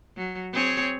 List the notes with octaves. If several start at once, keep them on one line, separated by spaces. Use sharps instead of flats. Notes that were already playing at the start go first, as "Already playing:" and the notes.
F#3
C4 G#4 C#5